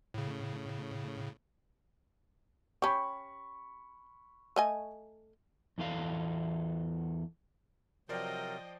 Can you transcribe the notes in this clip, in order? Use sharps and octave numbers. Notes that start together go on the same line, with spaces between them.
A2 C#3
C#4 G4 B5 C#6
A3 D#5 G#5
E2 E3 A4 F5
C3 F3 F#3 A#4 C5 D5 D#5 G5